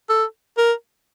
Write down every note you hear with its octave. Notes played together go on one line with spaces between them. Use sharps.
A4
A#4